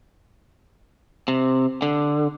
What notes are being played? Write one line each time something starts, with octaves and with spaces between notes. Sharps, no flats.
C3
D3